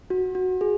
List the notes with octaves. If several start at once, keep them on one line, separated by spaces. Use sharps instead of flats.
F#4
F#4
G#4